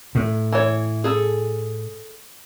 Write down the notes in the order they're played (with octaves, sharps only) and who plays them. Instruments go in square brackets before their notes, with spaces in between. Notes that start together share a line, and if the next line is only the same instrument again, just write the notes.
[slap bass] A2
[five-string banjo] E3 C#5
G#4 A4